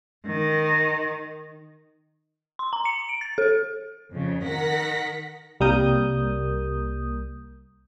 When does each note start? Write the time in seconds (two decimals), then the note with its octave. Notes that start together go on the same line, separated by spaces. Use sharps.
0.25 D#3
2.59 C6
2.73 A#5
2.85 C#7
3.09 D7
3.21 A6
3.38 A4
4.13 F2 C#3
4.44 D#3 A#4 F#5 A#6 B6
5.60 C2 G3 A#3 A#4 D#6 G6